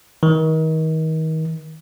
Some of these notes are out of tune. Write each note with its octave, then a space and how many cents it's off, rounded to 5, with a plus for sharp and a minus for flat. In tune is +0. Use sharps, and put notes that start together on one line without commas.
D#3 +35